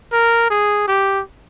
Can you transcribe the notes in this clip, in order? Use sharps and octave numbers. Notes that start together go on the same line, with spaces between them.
A#4
G#4
G4